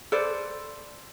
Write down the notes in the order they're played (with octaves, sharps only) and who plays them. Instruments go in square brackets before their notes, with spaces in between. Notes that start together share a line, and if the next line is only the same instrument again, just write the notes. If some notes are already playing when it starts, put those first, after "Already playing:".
[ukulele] A4 B4 C5 D5